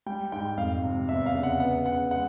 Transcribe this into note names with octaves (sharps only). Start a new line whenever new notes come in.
G3 G5
G#2 G5
F2 F5
C3
E2 E5
F5
C#3
F#5
B3 F#5
C#3 F#5
G#3 F#5